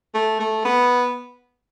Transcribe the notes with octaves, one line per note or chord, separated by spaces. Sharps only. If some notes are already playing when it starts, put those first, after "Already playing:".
A3
A3
B3